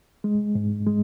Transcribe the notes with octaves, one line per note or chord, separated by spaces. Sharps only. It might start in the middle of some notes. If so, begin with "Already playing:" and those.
G#3
G#2
G#3